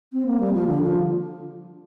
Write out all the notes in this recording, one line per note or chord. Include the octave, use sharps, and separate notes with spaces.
C4
A#3
G3
F3
D3
F3